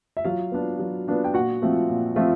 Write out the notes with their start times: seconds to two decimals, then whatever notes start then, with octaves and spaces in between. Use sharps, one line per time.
0.17 E5
0.25 F#3 F4 F5
0.52 B3 D4 F4
0.79 F#3
1.08 B3 D4 F4
1.24 G5
1.34 A#2 F#4 F#5
1.62 F3 A3 C4 F4
1.89 A#2
2.16 F3 A3 C4 F4